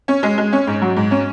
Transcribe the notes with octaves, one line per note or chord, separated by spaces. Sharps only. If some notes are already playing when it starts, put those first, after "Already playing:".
C#4
G#3
G#3
C#4
G#2
F#3
G#2
C#4